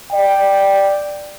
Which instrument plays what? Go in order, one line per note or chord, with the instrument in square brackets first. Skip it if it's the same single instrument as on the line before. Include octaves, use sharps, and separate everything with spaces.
[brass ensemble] D5 G5